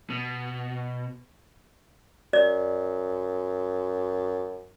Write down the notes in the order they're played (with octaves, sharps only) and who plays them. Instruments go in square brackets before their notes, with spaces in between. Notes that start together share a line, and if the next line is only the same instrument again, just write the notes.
[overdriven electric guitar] B2
[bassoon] F#2 [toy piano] D5